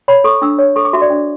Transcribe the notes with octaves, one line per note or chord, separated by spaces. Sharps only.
C#5 B5
A4 C#6
D4 E6
C#5
A4 C#6
D6
F#4 E5
D5
D4